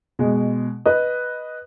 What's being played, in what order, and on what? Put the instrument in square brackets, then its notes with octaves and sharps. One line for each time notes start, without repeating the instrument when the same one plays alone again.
[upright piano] B2 G#3
B4 D#5